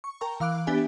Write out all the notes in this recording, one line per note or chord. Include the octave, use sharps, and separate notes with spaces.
C#6
A#4 G5 A5 A#5 C#6
E3 F5 D6 F#6 D7
B3 D4 G4 E5 G#5